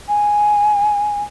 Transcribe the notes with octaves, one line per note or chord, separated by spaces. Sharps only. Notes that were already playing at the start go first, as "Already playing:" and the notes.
G#5